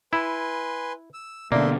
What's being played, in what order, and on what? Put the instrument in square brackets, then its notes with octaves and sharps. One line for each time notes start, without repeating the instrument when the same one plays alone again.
[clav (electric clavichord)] E4 [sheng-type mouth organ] B4 G#5 C6
[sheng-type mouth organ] E6
[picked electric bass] B2 D3 [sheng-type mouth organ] A3 E5 C6 [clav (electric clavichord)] A#3 [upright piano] D5